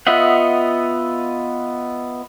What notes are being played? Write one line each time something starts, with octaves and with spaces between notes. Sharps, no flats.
B3 F4 D#5 E5 F#5